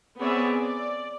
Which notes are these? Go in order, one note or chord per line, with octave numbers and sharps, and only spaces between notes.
B3 C4 G#4 C#5 D5 E5
D5